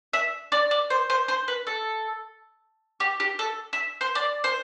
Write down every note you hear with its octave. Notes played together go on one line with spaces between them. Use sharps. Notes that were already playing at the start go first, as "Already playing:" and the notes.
E5
D5
D5
C5
C5
C5
B4
A4
G4
G4
A4
E5
C5
D5
C5